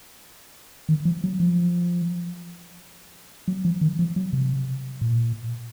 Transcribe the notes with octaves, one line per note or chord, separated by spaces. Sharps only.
D#3
F3
F#3
F3
F#3
F3
D#3
F3
F#3
C3
A#2